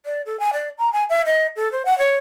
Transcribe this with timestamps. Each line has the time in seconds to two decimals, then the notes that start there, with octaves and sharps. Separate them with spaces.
0.06 D5
0.26 A4
0.40 G#5
0.53 D5
0.78 A#5
0.93 G#5
1.10 E5
1.26 D#5
1.56 A4
1.72 C5
1.85 F#5
1.98 C#5